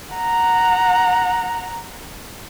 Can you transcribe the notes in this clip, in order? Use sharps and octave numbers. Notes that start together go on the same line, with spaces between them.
F#5 A#5